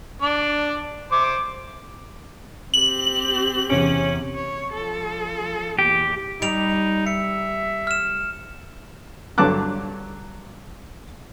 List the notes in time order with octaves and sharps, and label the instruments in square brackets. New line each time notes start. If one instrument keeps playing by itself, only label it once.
[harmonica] D4 D5
C5 D6
[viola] C4 G4 [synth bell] F#7
[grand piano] E2 C3 D7 [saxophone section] C#4
[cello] C#5
F3 A4
[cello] E2 A#2 [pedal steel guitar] G4
[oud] G3 [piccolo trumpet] D#4 [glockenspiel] D7 F7
[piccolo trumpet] E5 [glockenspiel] C#7
[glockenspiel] F6 E7
[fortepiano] G2 D3 F#3 A5 D6 F#6